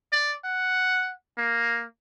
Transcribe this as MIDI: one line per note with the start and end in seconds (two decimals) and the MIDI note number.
0.12 0.34 74
0.44 1.13 78
1.38 1.85 58